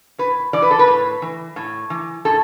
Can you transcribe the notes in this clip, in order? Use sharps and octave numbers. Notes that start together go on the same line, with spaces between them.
A2 B4
E3 D5
B4
A4
B4
A2
E3
A2
E3
A2 A4